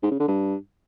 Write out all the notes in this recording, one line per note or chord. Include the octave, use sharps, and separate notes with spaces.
G#2
C#3
D3
G2